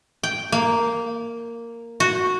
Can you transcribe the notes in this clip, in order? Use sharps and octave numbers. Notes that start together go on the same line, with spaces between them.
G5
A#3
F#4